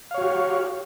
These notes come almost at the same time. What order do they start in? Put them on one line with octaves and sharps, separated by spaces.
F5 C#5 F#4 G4